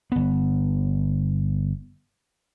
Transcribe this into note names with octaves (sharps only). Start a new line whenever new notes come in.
G1 B3